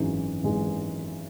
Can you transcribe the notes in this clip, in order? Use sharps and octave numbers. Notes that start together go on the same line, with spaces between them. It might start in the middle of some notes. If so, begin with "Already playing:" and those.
Already playing: G#1 F#2 E3 G#3
G#1 E3 G#3